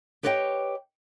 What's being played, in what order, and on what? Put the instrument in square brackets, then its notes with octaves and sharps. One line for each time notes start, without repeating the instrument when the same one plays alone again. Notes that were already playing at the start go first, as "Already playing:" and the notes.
[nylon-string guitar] G4 B4 C#5 D#5 F5 G5